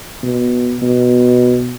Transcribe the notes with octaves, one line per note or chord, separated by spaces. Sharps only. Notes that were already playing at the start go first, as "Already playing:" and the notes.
B2
B2